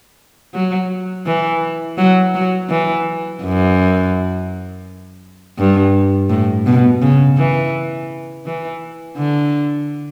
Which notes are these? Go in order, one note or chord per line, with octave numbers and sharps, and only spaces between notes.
F#3
E3
F#3
F#3
E3
F#2
G2
A2
B2
C#3
E3
E3
D3